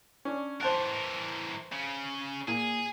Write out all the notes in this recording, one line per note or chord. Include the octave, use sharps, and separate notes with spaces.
C#4 D4
E3 A#4 C5 A5 F#6
C#3
A#2 G#4